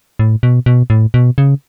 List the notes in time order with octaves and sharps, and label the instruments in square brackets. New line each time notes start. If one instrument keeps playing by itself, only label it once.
[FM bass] A2
B2
B2
A2
B2
C#3